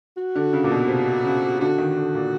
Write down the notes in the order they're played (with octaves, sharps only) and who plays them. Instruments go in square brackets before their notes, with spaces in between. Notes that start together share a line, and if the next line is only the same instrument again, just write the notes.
[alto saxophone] F#4
[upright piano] D3
C#3
A#2
B2
C3
C#3
[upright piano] D3 [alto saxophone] F#4
[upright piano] D#3
D3
A#2